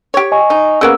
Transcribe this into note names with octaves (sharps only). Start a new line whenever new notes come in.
G4 C#5
D#5 G#5 C#6
D#4
C#3 A#3 B3 E6